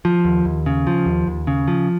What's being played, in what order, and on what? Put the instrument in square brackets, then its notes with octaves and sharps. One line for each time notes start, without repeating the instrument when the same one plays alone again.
[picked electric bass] F3
D#2
D#2
C#3
F3
D#2
D#2
C#3
F3